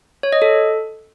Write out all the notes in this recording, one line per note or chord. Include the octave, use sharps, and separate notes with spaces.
C#5
D#5
A4